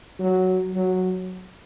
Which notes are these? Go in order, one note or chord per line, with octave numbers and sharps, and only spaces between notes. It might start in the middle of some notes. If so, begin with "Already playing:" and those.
F#3
F#3